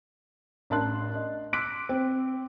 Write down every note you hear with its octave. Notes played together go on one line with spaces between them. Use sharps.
A1 D4 A#4 A5 C6 F#6
D#5
C6 D6 E6 F#6 B6 D7
C4